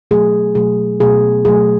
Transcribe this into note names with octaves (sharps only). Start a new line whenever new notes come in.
B2 F#3 A3 G#4
B2 F#3 A3 G#4
B2 F#3 A3 G#4
B2 F#3 A3 G#4